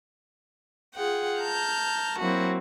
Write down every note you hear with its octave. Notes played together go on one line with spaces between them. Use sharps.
F4 G#4 F#5 G5
A5 A#5 F6 G6
F#3 A#3 C4 E4 F#4